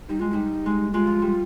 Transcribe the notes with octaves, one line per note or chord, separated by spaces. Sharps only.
G3 D#4
G#3 F4
F4
G3 D#4
G#3
G#3 F4
F3
G3